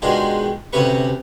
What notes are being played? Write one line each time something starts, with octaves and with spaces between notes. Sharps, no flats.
B2 D#3 G#3 D4 F4 G4
D2 C3 C#4 G4 B4 C#6